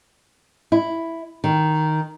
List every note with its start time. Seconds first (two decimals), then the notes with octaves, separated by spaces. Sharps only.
0.72 E4
1.44 D#3